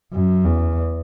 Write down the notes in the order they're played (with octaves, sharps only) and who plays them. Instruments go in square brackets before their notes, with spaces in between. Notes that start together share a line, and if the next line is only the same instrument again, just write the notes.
[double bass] F#2
E2